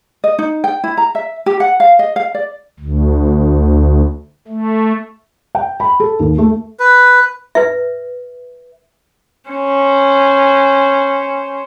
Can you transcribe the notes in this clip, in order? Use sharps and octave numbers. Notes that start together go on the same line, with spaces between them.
D#5
D#4
G5
E4
A#5
E5
G4
F#5
F5
D#5
F5
D5
D2
A3
G5
B5
A4
D#2
A3
B4
B4 E5
C#4 C5